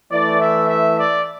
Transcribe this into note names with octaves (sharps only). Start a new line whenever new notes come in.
E3 A3 E4 D5
E5
E5
D5